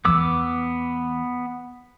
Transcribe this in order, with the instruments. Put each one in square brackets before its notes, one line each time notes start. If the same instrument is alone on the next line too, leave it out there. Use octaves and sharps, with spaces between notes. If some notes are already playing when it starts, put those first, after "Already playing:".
[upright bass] E2 E3 [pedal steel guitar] B3 D6 E6